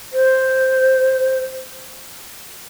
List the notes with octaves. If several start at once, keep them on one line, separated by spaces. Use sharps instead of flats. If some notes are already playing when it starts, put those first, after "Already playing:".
C5